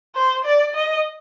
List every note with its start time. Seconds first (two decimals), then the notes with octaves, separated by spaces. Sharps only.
0.15 C5
0.44 D5
0.75 D#5